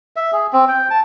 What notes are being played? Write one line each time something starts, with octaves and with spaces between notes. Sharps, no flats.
E5
G#4
C4
G5
A5